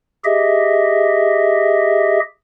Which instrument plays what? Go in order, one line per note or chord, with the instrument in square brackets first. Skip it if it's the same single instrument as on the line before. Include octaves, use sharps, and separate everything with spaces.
[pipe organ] G4 G#4 D#5 E5